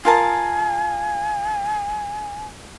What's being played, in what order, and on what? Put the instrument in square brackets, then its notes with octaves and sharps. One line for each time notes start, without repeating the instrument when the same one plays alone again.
[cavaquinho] F4 A#4 A5 [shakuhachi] G#5